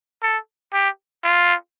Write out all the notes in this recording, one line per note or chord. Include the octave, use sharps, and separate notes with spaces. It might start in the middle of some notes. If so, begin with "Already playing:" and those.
A4
G4
F4